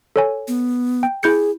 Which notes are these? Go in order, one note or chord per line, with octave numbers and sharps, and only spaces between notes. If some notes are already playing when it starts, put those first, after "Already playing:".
A4 C#5 G#5
B3
G5
E4 G#4 G6 C#7